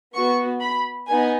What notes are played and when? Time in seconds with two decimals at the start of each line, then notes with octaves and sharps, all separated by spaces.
0.14 B3 F#4 C#6
0.60 B5
1.08 B3 D#4 G#5